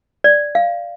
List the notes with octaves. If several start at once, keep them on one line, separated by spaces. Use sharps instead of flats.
D5
F5